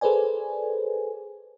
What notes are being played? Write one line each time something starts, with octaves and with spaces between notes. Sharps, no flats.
G#4 A4 B4 C5 D5 G#5